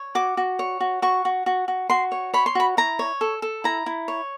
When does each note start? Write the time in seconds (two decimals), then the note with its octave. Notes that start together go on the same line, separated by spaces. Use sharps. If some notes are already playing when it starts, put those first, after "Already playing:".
Already playing: C#5
0.15 F#4 D6
0.37 F#4
0.59 C#5
0.80 F#4
1.02 F#4 C#6
1.25 F#4
1.46 F#4
1.68 F#4
1.90 F#4 C6
2.12 C#5
2.34 C#5 B5
2.46 C6
2.55 F#4 B5
2.77 E4 A#5
2.99 C#5
3.21 A4
3.42 A4
3.64 E4 A#5
3.86 E4
4.08 C#5